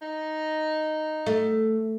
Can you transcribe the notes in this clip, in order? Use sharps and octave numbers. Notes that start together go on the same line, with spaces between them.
D#4
A3